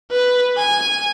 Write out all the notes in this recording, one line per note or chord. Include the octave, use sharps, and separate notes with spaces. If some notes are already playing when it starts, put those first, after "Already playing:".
B4
G#5